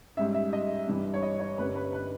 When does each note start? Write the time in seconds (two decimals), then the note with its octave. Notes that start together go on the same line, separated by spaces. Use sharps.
0.17 G#2 G3 C#4 E5
0.34 E5
0.53 D#5
0.88 G2 E3 G3
1.14 C#5
1.23 D#5
1.40 C#5
1.58 G1 G2 G3 A#3 C#4 B4
1.75 B4
1.93 B4